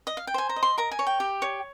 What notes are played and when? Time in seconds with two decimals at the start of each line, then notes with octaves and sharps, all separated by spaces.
0.07 D#5
0.17 F5
0.27 G5
0.34 C5 G#5
0.49 A#5
0.56 D#5
0.63 C6
0.78 A#4 A#5
0.91 G#5
0.99 C#5
1.07 G5
1.20 G4
1.42 C#5